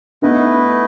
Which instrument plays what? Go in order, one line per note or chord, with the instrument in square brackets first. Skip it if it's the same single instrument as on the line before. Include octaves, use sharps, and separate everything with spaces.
[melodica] A3 E4 B4 D#5 [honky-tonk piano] B3 D#4